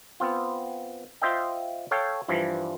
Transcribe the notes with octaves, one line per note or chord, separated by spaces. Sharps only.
B3 C4 F4
F4 C5 D#5 E5 G5
A4 C#5 F5 G5
G2 E3 F3 G3